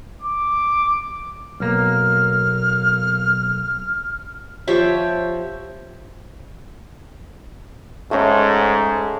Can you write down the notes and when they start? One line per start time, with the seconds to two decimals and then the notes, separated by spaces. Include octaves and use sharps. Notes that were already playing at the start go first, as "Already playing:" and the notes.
0.22 D6
1.60 B1 A#3 F6
4.68 F3 G4 C#5 E5
8.11 G#2 A3 C#4